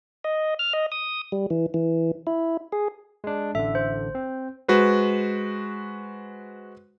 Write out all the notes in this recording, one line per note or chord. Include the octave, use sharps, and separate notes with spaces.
D#5
F6
D#5
D#6
G3
E3
E3
E4
G#4
G#3 D4
A1 D3 A4 E5
C5
C4
G#3 F#4 B4 C5